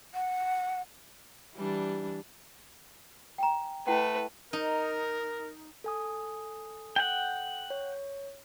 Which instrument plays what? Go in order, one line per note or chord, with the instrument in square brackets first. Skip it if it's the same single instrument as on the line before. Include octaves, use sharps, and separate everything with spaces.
[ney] F#5
[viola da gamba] E3 G3 D4
[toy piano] G5 G#5 A#5
[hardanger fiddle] A3 B4 [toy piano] E4 F#5 G5
[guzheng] D#4 [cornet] A#4
[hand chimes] A4 G#5 D#6
[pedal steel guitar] F#5 G5
[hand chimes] C#5